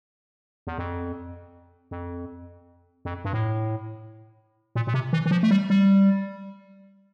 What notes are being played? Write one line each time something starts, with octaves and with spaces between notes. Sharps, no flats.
E2
F2
F2
F2
G2
A2
A#2
A#2
C3
E3
E3
F3
A3
G3
G3